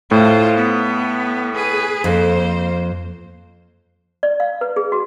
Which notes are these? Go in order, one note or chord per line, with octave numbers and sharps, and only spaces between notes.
A2 F4 C5
B3
G#4 B4
F2 A#3 C5
D5
F5
B4
G#4
F#4